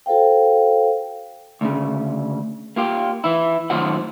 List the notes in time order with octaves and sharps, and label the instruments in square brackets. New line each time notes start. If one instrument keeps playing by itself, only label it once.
[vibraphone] F#4 A4 C5 F5 G5
[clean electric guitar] D2 A2 C#3
A#3 F4 G4
E3 E4
F#2 A2 D#3 F4 C5 F#5